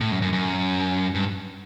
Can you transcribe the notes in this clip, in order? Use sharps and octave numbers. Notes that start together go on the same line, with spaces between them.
A2
F#2
F#2
F#2
G2